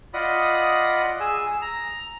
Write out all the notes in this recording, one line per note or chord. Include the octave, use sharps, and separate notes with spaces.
F4 D5 D#5 F#5 B5 D#6
G#4 G#5 E6
A#5